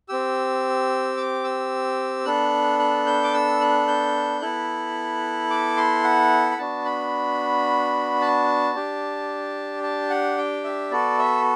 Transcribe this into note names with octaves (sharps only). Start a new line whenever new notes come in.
C4 G4 E6
D6
E6
B3 D4 A4 F#6
F#6
G6
D6
E6
F#6
G6
B3 E4 A4 F#6
D6
C6
F#5
B5
B3 D4 F#4 A5
B5
A5
D4 G4
A5
F#5
G5
E5
B3 F#4 A4 D5
E5